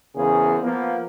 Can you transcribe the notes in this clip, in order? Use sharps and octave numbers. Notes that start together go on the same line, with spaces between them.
E2 C#3 A#3 G#4 C5
F3 A#3 B3